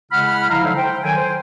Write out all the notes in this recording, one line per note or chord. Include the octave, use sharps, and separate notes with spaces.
C#3 G#3 E4 F#5 B5 F6
F3 E4 F5 A#5
D3 F3 F#3 G#3 D#4 E4
C5 G5
D#3 F#3 A4 G5 G#5
C5